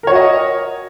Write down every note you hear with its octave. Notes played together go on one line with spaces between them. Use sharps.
F#4 A#4 C#5 D#5